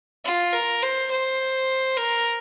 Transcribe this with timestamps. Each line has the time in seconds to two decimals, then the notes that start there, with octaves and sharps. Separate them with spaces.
0.25 F4
0.53 A#4
0.83 C5
1.11 C5
1.97 A#4